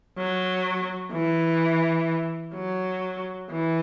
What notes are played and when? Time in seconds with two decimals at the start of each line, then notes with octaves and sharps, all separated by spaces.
0.18 F#3
1.12 E3
2.55 F#3
3.51 E3